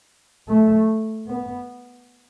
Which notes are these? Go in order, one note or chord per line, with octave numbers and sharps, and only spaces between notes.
A3
B3